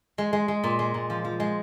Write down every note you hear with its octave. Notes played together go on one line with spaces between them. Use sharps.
G#3
G#3
G#3
A#2
G#3
A#2
F3
F3
G#3